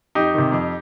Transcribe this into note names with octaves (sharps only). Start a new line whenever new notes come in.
F2 D#4 G4
C3 D#3
F2